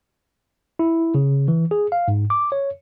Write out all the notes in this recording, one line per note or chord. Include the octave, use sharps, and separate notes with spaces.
E4
C#3
E3
G#4
F5
G#2
D6
C#5